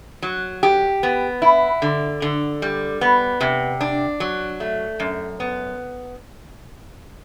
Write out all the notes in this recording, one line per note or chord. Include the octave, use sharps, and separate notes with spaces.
F#3
G4
B3
E4
D3
D3
G3
B3
C3
D4
F#3
A3
F#2
B3